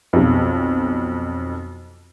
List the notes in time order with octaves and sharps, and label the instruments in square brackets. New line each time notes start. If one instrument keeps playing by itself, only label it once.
[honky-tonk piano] B1 F2